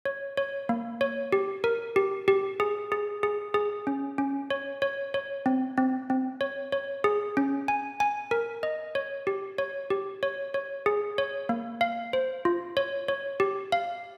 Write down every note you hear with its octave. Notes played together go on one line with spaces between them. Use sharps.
C#5
C#5
A#3
C#5
G4
A#4
G4
G4
G#4
G#4
G#4
G#4
C#4
C#4
C#5
C#5
C#5
C4
C4
C4
C#5
C#5
G#4
C#4
G#5
G#5
A#4
D#5
C#5
G4
C#5
G4
C#5
C#5
G#4
C#5
A#3
F5
C5
F4
C#5
C#5
G4
F5